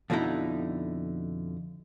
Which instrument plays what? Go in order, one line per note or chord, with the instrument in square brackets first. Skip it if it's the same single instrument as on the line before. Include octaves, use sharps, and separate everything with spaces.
[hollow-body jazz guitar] F2 B2 D3 D#4 E4 A#5